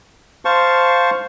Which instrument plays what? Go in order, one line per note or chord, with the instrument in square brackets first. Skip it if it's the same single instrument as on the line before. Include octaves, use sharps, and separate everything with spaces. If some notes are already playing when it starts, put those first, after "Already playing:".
[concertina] C5 F5 A5 C#6